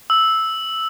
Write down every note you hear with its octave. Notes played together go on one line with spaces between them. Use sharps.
E6